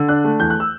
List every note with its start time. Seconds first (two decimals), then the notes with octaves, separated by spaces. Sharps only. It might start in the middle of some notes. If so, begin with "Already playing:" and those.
Already playing: D3
0.09 D4 F#6
0.24 A3
0.40 E2 G6
0.50 F#6
0.60 E6